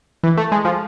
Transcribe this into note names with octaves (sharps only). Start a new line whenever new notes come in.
E3
A3
G#3
F3